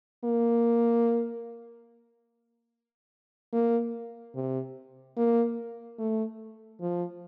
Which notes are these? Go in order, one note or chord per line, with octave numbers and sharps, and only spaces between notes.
A#3
A#3
C3
A#3
A3
F3